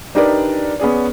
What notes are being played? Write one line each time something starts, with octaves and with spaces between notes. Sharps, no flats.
D4 D#4 G4 A#4 B4 D5
B3 C#4 G#4 D5